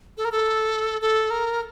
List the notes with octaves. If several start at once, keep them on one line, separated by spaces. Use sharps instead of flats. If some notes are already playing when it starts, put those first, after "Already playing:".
A4
A#4
A4
A4
A#4